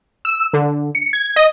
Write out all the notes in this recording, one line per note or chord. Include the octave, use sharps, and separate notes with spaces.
E6
D3
C#7
G#6
D#5